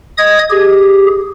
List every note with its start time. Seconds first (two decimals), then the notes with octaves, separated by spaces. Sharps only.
0.18 D#5 D#6 G#6
0.50 G4 G#4